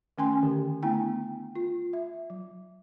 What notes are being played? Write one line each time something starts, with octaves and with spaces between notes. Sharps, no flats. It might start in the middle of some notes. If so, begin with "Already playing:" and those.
D#3 A3 C#4 G5 G#5 C6
D3 D#3 G4
A3 B3 D4 E4 G5 G#5
F4
E5
F#3